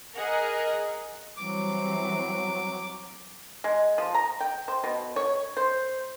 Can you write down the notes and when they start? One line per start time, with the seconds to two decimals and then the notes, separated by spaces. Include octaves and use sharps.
0.16 G#4 A#4 D#5 F#5
1.37 E3 F#3 G3 C4 D6
3.64 G#3
3.98 F3
4.14 A#5
4.40 G5
4.68 C5
4.84 B2
5.16 C#5
5.57 C5